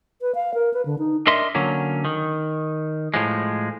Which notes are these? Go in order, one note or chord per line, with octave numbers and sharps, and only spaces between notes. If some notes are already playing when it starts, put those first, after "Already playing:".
B4
F5
A#4
B4
D3
D#4
D4 A#4 D#5 E5 C6
D3 F#3 A#3 C#4
D#3
A2 F3 G#3